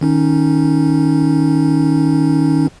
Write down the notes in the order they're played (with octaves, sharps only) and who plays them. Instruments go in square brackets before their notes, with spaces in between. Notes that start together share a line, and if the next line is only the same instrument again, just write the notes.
[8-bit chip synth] D#3 C#4 D#4